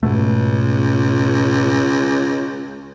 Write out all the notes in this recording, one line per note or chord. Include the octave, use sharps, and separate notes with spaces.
C#2 G#2 B2 A3